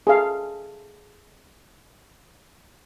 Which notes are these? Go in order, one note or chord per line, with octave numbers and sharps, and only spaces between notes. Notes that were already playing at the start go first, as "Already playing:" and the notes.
G#4 A4 F5